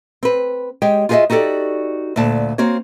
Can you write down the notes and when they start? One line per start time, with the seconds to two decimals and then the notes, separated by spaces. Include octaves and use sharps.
0.23 C4 B4
0.82 G#3 G4 C#5 G5
1.09 F4 F#4 G#4 C5 D#5 E5
1.30 D#4 F#4 G4 A4 D5
2.16 D2 A#2 D5 A5
2.58 A#3 C4 F#4 C#5